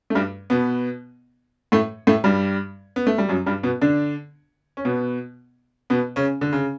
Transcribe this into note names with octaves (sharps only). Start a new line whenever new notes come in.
A3
G2 G3
B2 B3
A2 A3
A2 A3
G2 G3
B3
A3
G3
F#2 F#3
G2 G3
B2 B3
D3 D4
C#4
B2 B3
B2 B3
C#3 C#4
D3
C#3